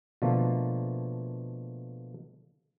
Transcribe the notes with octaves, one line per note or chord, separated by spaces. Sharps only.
B2 D3 F3 A3 A#3